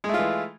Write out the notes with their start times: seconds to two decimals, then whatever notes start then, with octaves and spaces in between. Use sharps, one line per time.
0.04 G#3
0.09 A3
0.14 F4
0.19 E3